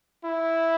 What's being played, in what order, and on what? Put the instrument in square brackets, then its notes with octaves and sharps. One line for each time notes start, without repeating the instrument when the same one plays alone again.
[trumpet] E4